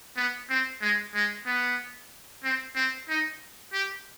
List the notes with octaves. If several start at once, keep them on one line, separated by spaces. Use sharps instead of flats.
B3
C4
G#3
G#3
B3
C4
C4
D#4
G4